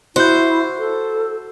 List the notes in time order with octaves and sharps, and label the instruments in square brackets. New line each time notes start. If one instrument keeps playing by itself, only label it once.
[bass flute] E4 [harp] F#4 G6 [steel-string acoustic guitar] C5
[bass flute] A4